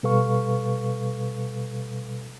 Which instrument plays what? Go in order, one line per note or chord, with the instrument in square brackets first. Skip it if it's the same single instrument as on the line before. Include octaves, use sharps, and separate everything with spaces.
[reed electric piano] B2 G3 A4 B4 F5 C#6